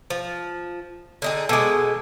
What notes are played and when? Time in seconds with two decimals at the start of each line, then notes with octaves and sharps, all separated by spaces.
0.10 F3
1.22 D3 D#4 G#4
1.49 B2 G#3 A4 G#5 D6